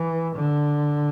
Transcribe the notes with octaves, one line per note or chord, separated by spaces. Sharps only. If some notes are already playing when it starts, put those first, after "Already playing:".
Already playing: E3
D3